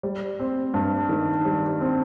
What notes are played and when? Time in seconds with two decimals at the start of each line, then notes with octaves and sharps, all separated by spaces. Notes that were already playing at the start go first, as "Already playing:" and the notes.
0.03 G3
0.40 C4
0.74 G2
1.09 D#3
1.45 G3
1.81 C4